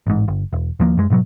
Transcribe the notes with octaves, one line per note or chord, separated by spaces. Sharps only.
A1 G#2
G1
E1
D#2 F3 A#3
F#2 G#3
G#2 B2 F3 F#3